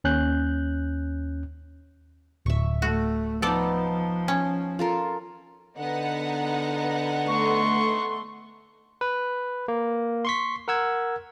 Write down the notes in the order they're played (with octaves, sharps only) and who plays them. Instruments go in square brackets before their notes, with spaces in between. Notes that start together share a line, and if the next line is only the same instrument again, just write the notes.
[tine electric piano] D#2 C#4 F#6 G6
[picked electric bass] D1 [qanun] E5 C#6
[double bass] A3 [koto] F#4
[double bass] F3 [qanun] B3 D#4 [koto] A4 D5
[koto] C#4
[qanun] F4 A4 A#4
[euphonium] D3 [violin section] B3 D#4 F#5
[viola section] A3 C6 [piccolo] C#6
[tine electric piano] B4
A#3
C6 C#6 B6
A#4 F#5 E6 G#6